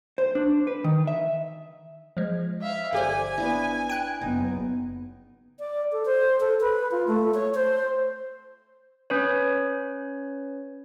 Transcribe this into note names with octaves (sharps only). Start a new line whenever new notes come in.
C5
D4
B4
D#3
E5
F3 G#3
E5 F5
G1 G4 C5 D5 F#5 G#5
B3 D4 E4
G5 F#6
F#1 B3 D#4
D5
A4
C5
A4
B4
F4
A3
C#5
C5
C#4 B4 C#5